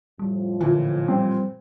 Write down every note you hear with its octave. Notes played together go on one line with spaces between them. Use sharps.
F2 A2 F3 G3
A#2 D3 E3
G3 C4